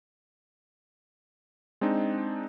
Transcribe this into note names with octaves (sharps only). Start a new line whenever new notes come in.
G#3 C4 D4 D#4